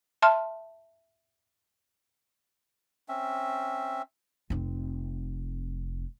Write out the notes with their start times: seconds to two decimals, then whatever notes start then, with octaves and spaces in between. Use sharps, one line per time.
0.22 E5 A5 C6 F6
3.08 C4 C#4 E5
4.50 F1 C4